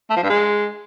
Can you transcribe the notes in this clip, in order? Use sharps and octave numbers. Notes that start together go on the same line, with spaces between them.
A3
F3
G2
G#3